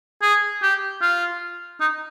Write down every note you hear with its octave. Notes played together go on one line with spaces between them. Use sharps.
G#4
G4
F4
D#4